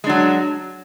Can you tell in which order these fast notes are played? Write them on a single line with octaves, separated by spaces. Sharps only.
G#3 D4 F#3